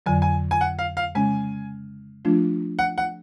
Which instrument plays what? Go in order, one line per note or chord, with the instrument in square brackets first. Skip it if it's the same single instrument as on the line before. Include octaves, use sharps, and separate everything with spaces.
[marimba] F2 D3 F#3 [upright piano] G#5
[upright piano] G#5
G#5
F#5
F5
F5
[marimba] C#3 G#3 C#4 [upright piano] G#5
[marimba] F3 A3 D4 F4
[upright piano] F#5
F#5